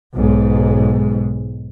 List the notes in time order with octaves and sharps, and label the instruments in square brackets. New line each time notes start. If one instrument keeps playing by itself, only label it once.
[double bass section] B1 G#2